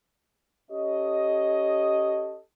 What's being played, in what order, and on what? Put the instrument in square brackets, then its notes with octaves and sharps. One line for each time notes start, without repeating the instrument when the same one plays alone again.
[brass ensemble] C#4 G4 A4 C#5 D#5